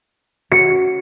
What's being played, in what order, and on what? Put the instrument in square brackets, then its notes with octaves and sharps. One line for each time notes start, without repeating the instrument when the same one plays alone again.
[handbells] F#4 [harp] C#7